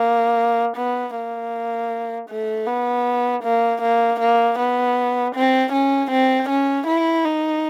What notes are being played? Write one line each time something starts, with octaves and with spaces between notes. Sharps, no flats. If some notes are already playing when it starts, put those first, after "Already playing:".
Already playing: A#3
B3
A#3
A3
B3
A#3
A#3
A#3
B3
C4
C#4
C4
C#4
E4
D#4